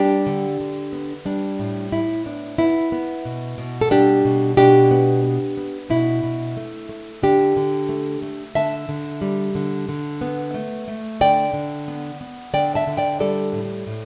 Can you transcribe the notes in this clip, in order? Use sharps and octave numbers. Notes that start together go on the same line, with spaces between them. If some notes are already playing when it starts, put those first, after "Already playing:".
Already playing: G3 B3 D4 G4
D3
D3
B3
G3 D4
A2
A2 E4
B3 D4
B3 E4
B3
B2
B2
A4
G3 D4 G4
B2
B2 D4 G4
B3
B3
B3
B2 E4
B2
A3
A3
D3 D4 G4
D3
A3
A3
D3 E5 A5
D3
G3
D3
D3
B3
A3
A3
D3 D5 G5
D3
B3
B3
D3 D5 G5
E5 A5
D3
D5 G5
G3 A4 D5
A2
A2